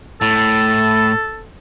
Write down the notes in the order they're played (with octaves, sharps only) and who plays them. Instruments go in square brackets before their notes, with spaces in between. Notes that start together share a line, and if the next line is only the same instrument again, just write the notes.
[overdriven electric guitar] A2 [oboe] A4